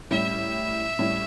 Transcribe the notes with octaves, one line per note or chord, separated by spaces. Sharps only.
A2 G3 C#4 E4 E5
A2 G3 C#4 E4